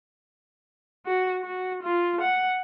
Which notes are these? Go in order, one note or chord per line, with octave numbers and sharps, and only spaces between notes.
F#4
F#4
F4
F#5